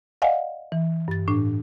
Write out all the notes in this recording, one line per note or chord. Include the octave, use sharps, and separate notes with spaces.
D5 D#5 F5 F#5 G#5
E3
G2 A6
A2 D4